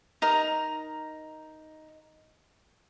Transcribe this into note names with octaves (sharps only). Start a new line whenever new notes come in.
D#4 A#4 A#5